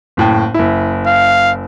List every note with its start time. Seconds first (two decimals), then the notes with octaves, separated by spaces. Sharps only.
0.17 F#1 A2 G5
0.54 F#1 E4
1.07 F5